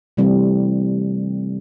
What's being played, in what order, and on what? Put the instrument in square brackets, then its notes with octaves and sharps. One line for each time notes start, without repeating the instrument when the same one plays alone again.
[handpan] C3 E3 G3 A3 C4